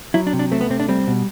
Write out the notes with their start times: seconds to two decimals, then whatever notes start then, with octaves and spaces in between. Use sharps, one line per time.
0.14 F#3 E4
0.27 D4
0.33 C3
0.39 D4
0.52 A3 C4
0.61 B3
0.70 C3 C4
0.80 D4
0.88 G3 C4
1.07 B2